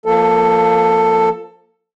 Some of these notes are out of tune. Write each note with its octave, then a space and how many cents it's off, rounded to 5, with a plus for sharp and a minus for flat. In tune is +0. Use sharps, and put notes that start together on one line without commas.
F3 +0 A#3 +0 A4 +15